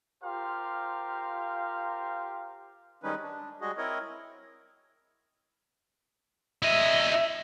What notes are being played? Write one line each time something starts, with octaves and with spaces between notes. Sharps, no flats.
F4 G4 A#4 C5 F5
D#3 G3 G#3 C#4 D#4 B4
D4
G3 G#3 F#4 G#4 D#5
C4 E4 A#4 C#5 D#5
E4 D#5 E5